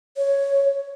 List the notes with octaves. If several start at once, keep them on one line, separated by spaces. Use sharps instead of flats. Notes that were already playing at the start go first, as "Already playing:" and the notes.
C#5